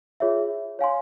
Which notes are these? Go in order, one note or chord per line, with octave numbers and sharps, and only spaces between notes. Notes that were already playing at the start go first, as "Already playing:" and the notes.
F4 G#4 C#5 E5
C#5 F5 G#5 C6